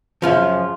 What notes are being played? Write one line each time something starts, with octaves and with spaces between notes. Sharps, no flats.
F#2 C#3 F3 F4